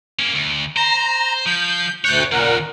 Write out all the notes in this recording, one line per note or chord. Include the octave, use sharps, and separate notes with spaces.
A#3 C#4
D2
C5 A#5
F3 G6
D2 A4 C#5 F#6 G6
D#2 A#2 C#3 A#4 F#5